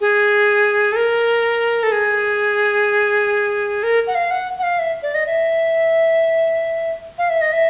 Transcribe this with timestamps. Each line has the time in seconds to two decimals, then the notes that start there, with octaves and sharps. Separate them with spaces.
0.01 G#4
0.92 A4
0.96 A#4
1.83 A4
1.92 G#4
3.83 A#4
4.07 F#5
4.15 F5
4.31 F#5
4.59 F#5
4.63 F5
4.79 E5
5.03 D5
5.15 D#5
5.27 E5
7.18 F5
7.30 E5
7.41 D#5
7.53 E5